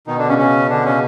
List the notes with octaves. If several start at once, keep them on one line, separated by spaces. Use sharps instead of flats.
B2 D#3 D#4
D3 D4
C#3 C#4
C#3 C#4
D3 D4
C#3 C#4